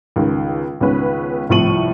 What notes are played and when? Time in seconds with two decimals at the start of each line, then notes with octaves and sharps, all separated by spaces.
0.16 C#2 D#3
0.81 C#2 D#3 B3 C#4 B4
1.49 C2 A2 F3 C#6 D#7 F#7